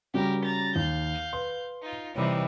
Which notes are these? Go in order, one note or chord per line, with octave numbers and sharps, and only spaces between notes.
C#3 G3 F#4 G4 A#4
A#5 A6
D#2 F5 G6
B4 C6
D#4 F4
C3 E3 G3 D#4 C#5